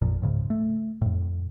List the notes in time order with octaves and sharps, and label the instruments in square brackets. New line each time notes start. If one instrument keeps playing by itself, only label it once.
[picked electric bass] A1 F2 A#2 F3
C#2 G#2 C#3
A3
F2 A2